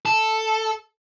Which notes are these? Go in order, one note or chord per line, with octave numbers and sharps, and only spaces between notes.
A4